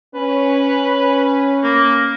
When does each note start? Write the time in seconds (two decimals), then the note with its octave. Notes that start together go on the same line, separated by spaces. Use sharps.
0.15 C#4 B4
1.63 A#3